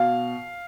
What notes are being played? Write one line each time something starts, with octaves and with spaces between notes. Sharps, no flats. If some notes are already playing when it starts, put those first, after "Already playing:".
Already playing: B2 F5